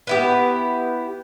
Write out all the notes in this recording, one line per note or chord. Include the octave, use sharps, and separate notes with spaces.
B3 E4 G4